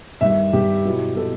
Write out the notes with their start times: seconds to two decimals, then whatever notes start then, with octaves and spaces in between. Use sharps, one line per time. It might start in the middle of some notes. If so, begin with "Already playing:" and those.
0.21 G2 D#3 G3 E5
0.53 G2 D#3 G3 G4
0.85 B2 F#3 B3 E4
1.16 B2 F#3 B3 E4 A4